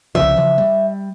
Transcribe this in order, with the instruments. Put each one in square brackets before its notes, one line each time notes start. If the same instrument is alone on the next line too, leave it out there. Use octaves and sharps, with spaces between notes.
[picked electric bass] C2 C#3 F3 [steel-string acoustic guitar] E5
[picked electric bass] C#3 E3 F3
G3